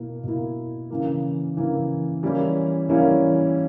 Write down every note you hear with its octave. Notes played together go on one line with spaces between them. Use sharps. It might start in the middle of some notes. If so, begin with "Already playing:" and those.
Already playing: B2 A#3 E4
B2 A#3 E4
C#3 E3 A#3
C#3 E3 A#3
E3 G3 A#3 C#4 E4
E3 G3 A#3 C#4 E4